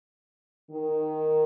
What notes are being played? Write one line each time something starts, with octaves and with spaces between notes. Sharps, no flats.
D#3